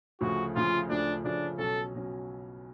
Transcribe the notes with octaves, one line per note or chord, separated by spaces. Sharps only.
D2 C#3 F3 A3 F#4
D2 C#3 F3 A3 F4
D2 C#3 F3 A3 D4
D2 C#3 F3 A3 D4
B1 B2 F#3 C#4 A4
B2 F#3 C#4